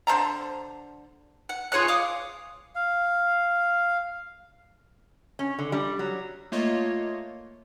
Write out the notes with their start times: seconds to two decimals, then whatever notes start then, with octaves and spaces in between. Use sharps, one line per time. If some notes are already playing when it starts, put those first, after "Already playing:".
0.07 D3 C5 A5 A#5
1.49 F#5
1.72 F4 G#4 C#5 F#6
1.88 F5 D6 D#6
2.75 F5
5.39 C#4
5.59 D3
5.72 G3
5.99 F#3
6.52 A3 A#3 F4 C#5 D#5